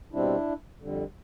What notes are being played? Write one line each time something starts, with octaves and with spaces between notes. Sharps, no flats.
B2 G3 C4 D4 E4
F2 D3 G3